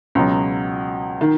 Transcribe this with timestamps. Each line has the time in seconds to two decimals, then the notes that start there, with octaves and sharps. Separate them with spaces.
0.15 C#2 B2 F#3
1.21 D#3